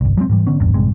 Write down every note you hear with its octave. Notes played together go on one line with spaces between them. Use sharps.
G1 C2
F#3 G#3 B3 C4
G#2 E3 G3
D3 B3 C#4
A1 E2 G2
A#1 G2 C3 G#3